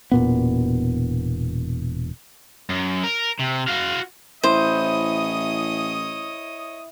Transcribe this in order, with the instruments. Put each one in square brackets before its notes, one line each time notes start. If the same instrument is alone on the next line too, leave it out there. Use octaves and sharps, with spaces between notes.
[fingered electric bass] E1 A#2 B3
[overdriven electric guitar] F#2
A#4
C3
F#4 F5
[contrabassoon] A1 [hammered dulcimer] E4 [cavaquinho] C5 [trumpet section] C#5 D#5 D#6